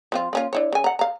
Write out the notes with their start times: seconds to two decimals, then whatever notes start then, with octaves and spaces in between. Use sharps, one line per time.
0.12 F3 C4 F4
0.33 A#3 C#4 F4
0.53 D4 E4 C#5
0.73 C#3 G#5
0.84 F#5 A#5
0.99 F5 A#5